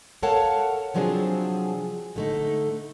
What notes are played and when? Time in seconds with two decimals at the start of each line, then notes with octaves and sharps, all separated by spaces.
0.23 A4 A#4 C#5 F5 F#5 A5
0.94 C3 F3 F#3 C4 D4 G#4
2.16 D3 A3 D#4